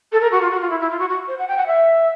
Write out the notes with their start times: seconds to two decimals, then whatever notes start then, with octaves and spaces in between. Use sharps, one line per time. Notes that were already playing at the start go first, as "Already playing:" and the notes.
0.12 A4
0.21 A#4
0.31 F#4
0.41 F4
0.50 F#4
0.60 F4
0.69 E4
0.80 E4
0.90 F4
0.99 F#4
1.09 F#4
1.27 C5
1.38 F#5
1.48 G5
1.57 F#5
1.66 E5